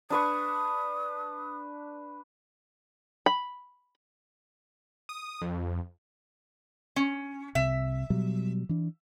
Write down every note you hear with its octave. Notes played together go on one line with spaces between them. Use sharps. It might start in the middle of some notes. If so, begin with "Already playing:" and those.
D4 B4 C#6 D#6
B5
D#6
F2
C#4
C2 C3 E5
B2 F#3 G3
E3 D4